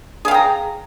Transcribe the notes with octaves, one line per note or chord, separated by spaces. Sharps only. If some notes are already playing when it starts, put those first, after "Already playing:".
G#4 F5 G5 A#5